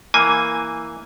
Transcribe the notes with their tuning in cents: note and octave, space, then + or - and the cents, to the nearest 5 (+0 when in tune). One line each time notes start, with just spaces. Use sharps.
E3 +0 A#3 +0 G#5 +0